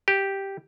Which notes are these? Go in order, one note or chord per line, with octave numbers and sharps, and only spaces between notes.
G4